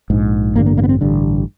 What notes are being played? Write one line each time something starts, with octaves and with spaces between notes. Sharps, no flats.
A#1 G#2
A1 G2 D3 A#3
A#3
A#3
B3
C4
A1 G2 D3